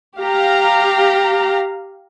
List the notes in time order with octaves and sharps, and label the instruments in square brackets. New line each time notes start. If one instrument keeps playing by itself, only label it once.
[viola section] G4 F5 A#5